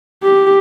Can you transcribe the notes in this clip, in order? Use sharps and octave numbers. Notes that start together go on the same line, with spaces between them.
G4